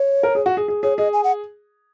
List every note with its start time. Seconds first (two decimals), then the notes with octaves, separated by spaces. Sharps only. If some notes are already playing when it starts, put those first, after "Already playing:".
Already playing: C#5
0.23 A#4
0.35 G#4
0.46 F#4
0.57 G#4
0.68 G#4
0.83 G#4 C#5
0.98 G#4 D#5
1.13 G#5
1.24 F#5